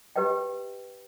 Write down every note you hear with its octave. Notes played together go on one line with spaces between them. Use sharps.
G4 B4 D#5 G5